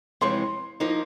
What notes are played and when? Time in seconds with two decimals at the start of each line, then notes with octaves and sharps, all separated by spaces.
0.21 F2 C3 E3 G#3 C#4 C6
0.80 F3 A#3 D#4